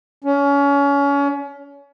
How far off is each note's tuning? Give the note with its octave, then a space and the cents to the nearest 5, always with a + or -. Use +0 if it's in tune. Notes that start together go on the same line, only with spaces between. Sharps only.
C#4 +30